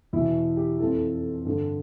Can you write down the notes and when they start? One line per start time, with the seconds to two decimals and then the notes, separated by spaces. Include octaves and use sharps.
0.13 E2 B2 E4
0.57 G4
0.79 F2 E3 A4
1.45 G2 D3